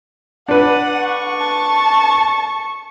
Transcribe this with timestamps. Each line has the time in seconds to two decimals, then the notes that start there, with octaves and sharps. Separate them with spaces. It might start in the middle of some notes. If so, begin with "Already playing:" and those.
0.48 D4 B4 F#5
1.06 C#6
1.40 A5